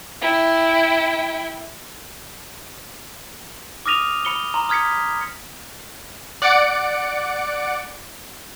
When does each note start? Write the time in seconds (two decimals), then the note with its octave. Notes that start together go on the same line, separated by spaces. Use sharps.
0.21 E4 G5
3.86 D6 D#6 F6 A#6 D#7 F7
4.25 B5 C#7 F7 G7
4.54 A#5 C6
4.69 D#6 F6 G#6 B6 C#7
6.42 D5 F#5 D6 C#7 D7